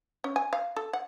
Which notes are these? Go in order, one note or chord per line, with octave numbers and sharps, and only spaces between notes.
C#4
G#5
F5
A4
F#5